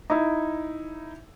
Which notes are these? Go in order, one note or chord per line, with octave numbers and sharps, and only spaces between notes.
D#4 E4